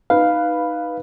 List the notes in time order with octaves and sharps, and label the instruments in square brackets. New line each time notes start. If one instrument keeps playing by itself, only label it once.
[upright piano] D#4 B4 [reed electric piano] F5